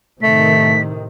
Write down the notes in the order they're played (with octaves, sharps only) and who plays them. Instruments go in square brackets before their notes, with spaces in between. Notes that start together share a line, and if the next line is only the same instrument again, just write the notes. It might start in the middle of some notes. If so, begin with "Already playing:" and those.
[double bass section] A2 C3 D#3 [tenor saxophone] A3 [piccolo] B6